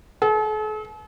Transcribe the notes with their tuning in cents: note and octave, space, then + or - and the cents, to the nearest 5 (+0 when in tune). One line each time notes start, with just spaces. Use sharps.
A4 -45